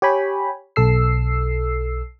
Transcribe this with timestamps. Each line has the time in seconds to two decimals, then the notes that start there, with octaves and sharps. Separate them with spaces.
0.02 G4 C#5 G5 G#5 B5
0.76 B1 A4 E6 C7